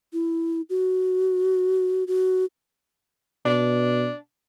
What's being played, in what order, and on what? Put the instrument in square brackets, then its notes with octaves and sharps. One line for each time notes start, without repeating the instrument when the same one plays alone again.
[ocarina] E4
F#4
F#4
[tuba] B2 [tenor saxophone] D4